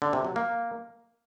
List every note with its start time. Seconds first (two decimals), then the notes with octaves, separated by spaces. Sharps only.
0.02 D3
0.13 C3
0.25 F#3
0.36 A#3